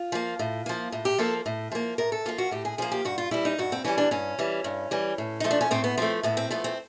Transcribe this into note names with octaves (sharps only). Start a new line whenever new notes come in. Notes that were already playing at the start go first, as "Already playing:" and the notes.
Already playing: F4
F3 A#3
A2
F3 A#3
A2
G4
F3 A#3 A4
A2
F3 A#3
A2 A#4
A4
F3 A#3 F4
F#4
A2 G4
G#4
F3 A#3 G#4
G4
G2 F#4
F4
E3 G3 E4
D#4
G2 F#4
C4
E3 G3 C#4
D4
G2 C#4
E3 G3
G2
E3 G3
A2
F3 A3 D#4
D4
C#4
A2 C4
B3
F3 A3 C4
A2 B3
C4
F3 A3 B3
C4